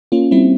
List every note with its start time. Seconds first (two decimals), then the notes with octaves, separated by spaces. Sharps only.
0.12 A#3 C#4 F4
0.31 G3 C4 E4